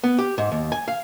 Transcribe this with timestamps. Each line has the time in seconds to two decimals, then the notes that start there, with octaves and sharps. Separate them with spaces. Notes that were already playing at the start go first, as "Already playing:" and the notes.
0.04 B3
0.18 G4
0.38 G#2
0.52 D#2
0.72 G#5
0.88 F5